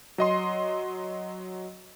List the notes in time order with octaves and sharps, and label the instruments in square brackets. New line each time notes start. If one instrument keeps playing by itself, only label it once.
[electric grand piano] F#3 D#5 C6